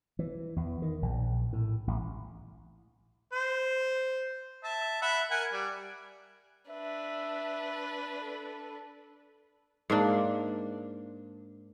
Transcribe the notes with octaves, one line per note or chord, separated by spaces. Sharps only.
E3
E2
D#3
A#1
A2
A1
C5
E5 A5
E5 F#5 B5
A#4 F#5 G#5
G3
D4 B4 E5
A4
G#2 A#3 D4